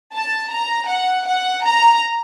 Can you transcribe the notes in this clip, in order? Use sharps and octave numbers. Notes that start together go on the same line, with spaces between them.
A5
A#5
F#5
F#5
A#5